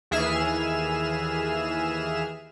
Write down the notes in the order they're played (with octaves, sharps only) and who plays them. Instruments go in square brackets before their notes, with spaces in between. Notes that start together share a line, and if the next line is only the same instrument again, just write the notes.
[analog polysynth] D#2 E3 G#4 E5 F6 E7